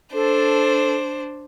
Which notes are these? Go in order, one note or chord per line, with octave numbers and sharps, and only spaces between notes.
D4 A4 C5